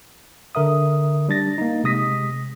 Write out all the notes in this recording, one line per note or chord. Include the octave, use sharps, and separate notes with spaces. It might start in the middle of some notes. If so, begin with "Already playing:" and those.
D3 A#4 E5 D#6
G3 D4 A6 A#6
A#3 D#4
C3 G#3 D#6 A#6 B6